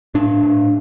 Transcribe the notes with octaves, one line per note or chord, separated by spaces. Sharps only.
A2 D4
A2